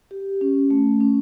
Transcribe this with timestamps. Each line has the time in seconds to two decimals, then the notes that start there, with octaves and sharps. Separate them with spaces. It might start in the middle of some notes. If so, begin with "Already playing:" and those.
0.11 G4
0.41 C#4
0.70 A3
1.00 C#4